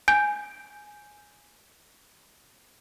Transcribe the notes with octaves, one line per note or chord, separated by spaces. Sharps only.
G#5 G6 D7